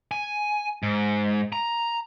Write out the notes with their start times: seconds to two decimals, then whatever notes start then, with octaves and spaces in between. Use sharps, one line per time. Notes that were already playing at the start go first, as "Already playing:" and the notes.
0.11 G#5
0.83 G#2
1.52 A#5